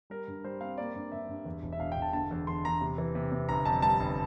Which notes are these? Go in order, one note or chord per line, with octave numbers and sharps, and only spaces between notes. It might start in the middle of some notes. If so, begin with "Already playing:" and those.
G3 A#4
G2
G3 C5
C4 F5
A#3 D5
G2
G2 E5
G2
E2
E1
E5
E1 F5
E1 G5
A5
D3 A5
E2
E2 C6
E2 A#5
C3
E3
C3
C3
G1 A#5
F2 A5
G3 A5
G1